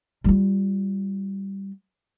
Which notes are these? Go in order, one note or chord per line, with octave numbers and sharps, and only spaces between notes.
G3 F4